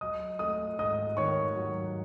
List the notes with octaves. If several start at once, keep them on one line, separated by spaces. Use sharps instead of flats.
F#3 D#5 D#6
A3 D#5 D#6
G#2 D#5 D#6
D#3 C#5 C#6
F#3